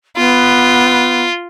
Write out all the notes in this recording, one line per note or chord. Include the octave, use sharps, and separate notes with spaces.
B3 F4